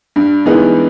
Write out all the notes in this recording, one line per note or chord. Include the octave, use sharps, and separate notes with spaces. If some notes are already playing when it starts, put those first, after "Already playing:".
G2
E3 G#3 B3 D#4